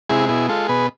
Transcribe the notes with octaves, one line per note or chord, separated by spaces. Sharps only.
C3 G#3 E4 G#4
B2 E4 G#4
G#3 F4 A4
B2 G#4 B4